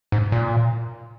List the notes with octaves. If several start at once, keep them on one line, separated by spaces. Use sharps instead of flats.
G#2
A#2